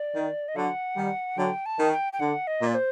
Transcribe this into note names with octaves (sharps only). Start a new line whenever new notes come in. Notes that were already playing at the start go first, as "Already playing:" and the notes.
Already playing: D5
D#3
D#5
D3 F#3 F#5
D#3 G3
D3 F#3 G5
A5
D#3
G5
G5
D3 F#5
D#5
A#2
D5
C5